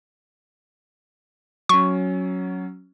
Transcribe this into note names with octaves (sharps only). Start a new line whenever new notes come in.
F#3 C#4 C#6